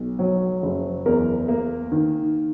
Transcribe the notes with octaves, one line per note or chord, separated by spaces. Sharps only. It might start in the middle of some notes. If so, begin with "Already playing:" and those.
Already playing: B1
F#3
F#1
E2 A#4
A#3
D#3